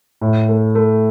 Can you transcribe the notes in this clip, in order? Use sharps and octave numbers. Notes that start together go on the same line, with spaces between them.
A2
A3
A3